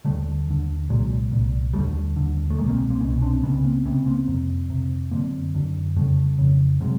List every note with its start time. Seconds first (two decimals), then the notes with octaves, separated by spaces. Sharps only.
0.05 D#2 D3 G3 A3
0.47 D#2 D3
0.89 C2 A#2 F#3 G#3
1.32 C2 A#2
1.74 D#2 D3 G3 A3
2.16 D#2 D3
2.50 A3
2.58 C2 B2 G#3 A#3
2.69 A#3 C4
2.90 A#3 C4
3.00 C2 B2 B3 C#4
3.22 C4 D4
3.43 C#2 C3 B3 C#4
3.64 A#3 C4
3.85 C#2 C3 B3 C#4
4.06 A#3 C4
4.28 F2 C3
4.70 F2 C3
5.11 F#2 D3 A#3 C4
5.54 F#2 D3
5.96 F2 C#3 G3 A3
6.38 F2 C#3
6.81 C3 F#3 G#3